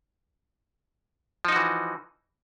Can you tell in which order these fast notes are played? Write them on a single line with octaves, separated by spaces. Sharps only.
F3 D#4 F#4 E3